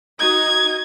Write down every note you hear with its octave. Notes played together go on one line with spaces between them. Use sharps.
D#4 F#4 D#5 G#6